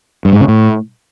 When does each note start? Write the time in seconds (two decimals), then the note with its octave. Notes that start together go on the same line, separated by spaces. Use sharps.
0.25 G2
0.33 G#2
0.40 C#3
0.48 A2